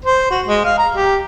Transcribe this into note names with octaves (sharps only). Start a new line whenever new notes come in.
C5
F#4
G#3
F5
A#5
G4